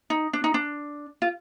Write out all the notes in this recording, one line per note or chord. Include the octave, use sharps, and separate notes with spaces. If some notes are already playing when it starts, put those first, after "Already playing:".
D#4
D4
D#4
D4
F4